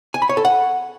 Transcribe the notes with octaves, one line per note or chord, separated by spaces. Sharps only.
G#5
B5
C#5
A4
F#5